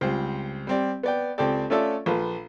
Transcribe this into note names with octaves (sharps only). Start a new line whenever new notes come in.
C#2 G3 C4 G4 C5
G3 C4 D5
B3 D5 G5
C#2 C4 G4 A4 D5
A3 C#4 F4 A4 D5 E5
A#1 F4 A4 B4